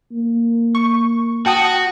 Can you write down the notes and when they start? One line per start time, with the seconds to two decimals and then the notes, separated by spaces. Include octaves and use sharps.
0.11 A#3
0.75 C#6
1.46 F#4 G5 A5 D#6